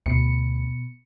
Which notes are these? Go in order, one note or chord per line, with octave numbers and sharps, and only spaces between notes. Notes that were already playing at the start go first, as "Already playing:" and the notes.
D2 B2 C#7